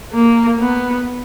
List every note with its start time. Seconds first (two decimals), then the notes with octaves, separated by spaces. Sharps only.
0.14 A#3
0.60 B3